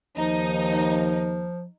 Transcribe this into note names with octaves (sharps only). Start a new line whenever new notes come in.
D#2 F3 D#4